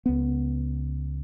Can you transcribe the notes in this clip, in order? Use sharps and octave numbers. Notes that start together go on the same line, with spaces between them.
C#2 B3